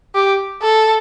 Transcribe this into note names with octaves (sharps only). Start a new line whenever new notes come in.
G4
A4